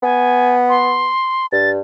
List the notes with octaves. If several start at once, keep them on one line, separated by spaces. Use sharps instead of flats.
B3 G#5
C6
G2 A6